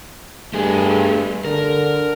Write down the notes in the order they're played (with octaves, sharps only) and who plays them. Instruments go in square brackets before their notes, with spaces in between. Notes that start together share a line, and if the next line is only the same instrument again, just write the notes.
[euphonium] G2 [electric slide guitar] A3 G#4
[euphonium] D3 [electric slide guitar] A#4